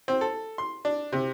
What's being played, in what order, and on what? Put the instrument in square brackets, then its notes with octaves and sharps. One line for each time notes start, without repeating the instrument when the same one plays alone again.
[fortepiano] C4
A4
C6
D4
C3